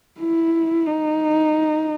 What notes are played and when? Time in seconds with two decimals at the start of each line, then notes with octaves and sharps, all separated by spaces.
0.20 E4
0.86 D#4